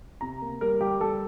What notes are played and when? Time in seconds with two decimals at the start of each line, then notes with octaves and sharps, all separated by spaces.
0.21 C3 A#5
0.42 A#3
0.61 G3 A#4
0.81 G3 G4
1.00 G3 A4